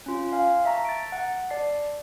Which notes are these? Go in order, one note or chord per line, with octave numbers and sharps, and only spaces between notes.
C#4 F4
F5 G#5
E5 A5 A#5 C#6
A6 D7
F#5
D5 A5 C7